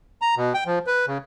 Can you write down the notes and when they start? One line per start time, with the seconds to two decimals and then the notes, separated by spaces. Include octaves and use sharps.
0.22 A#5
0.37 B2
0.54 G5
0.66 F3
0.87 B4
1.07 C#3